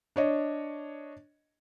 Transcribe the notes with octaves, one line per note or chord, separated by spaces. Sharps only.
D4 C#5 D#5